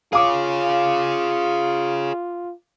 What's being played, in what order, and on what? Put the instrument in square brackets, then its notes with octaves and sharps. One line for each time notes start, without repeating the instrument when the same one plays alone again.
[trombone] F4 [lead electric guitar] G#4 C#5 [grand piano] F5 D6